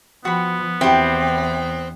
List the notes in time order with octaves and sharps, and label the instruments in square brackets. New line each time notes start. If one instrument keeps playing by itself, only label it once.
[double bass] F3 [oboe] B3 [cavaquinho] F#4 B5
[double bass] E2 [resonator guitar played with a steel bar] C4 [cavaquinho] E4 F#4 G4